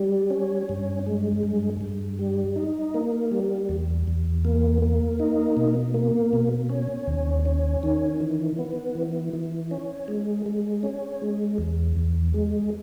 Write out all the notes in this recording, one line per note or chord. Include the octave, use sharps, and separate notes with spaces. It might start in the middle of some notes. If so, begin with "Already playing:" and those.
Already playing: G3
C#4
G2
G#3
G2
G2
G3
D#4
A#3
G3
E2
E2
A#3
A#3
D#4
B2
A#3
B2
C#4
D#2
C#4
D#3
E3
B3
E3
E3
C#4
G#3
G#3
C#4
G#3
E2
E2
G#3